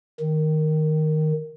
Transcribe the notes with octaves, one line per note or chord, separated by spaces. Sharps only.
D#3